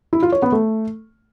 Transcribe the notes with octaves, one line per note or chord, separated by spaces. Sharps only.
E4
F4
C#5
B3
A3